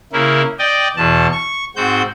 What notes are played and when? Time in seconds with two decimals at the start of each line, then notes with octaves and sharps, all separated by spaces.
0.13 C#3 A#3 E4
0.59 D5 D#5 G5
0.97 E2 B2 A5
1.32 C#6
1.76 G#2 C4 F#4 G6